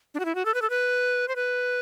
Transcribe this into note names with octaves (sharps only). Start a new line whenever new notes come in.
D4
F#4
E4
F#4
A4
B4
A4
B4
C5
B4